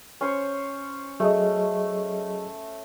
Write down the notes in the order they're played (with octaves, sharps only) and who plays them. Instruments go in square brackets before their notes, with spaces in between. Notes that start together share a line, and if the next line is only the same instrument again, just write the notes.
[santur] C#4 C5 C#5
[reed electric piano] F#3 G#4 D#5 [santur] A3